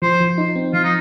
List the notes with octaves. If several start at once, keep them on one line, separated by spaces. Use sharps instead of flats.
F3 C5
F3
D#4
C4
F3 F4
D#4